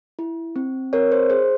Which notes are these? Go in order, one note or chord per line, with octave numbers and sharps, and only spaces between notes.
E4
C4
C4 A#4 C#5
C5
G#4 C5